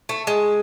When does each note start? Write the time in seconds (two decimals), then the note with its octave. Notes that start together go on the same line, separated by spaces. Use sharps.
0.09 A3
0.27 G#3